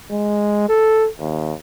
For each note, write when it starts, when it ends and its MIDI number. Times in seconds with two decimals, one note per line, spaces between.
0.11 0.64 56
0.69 1.08 69
1.19 1.53 39